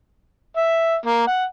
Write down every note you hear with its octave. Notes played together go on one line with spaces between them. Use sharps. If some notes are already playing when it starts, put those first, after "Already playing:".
E5
A#3
F#5